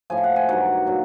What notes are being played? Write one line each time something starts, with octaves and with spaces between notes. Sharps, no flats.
A2 F3 G#5
G5
F#5
G#5
G2 D#3 F#3 F#5
A#2 F#3